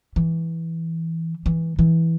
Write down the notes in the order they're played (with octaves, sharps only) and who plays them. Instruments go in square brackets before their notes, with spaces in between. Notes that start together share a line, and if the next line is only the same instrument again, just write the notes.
[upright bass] E3
E3
E3